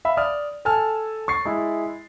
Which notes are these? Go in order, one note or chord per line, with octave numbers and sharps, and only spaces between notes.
E5 F5 B5 E6
D5 D#6 F6
A4 G#5 A5 E6 F6
C#6 A6 C7
G#3 E4